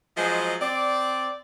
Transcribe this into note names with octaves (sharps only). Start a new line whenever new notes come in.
F3 F#3 G#3 C5 D#5
C4 D5